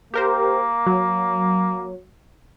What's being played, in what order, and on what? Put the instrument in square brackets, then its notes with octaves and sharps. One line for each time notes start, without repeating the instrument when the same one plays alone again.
[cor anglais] A#3 [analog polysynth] G4 A#4 C5
[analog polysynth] F#3